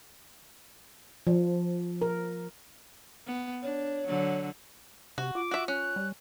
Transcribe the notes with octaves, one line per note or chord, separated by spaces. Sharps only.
F3
A#4
B3
D4 C#5
D3 F#3
C3 F#4
F4 D6
F#4 E5
C#4 F#6
G3